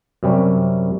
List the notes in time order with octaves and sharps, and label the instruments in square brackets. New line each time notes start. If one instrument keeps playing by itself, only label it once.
[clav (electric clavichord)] F#2 C3 G3 C#4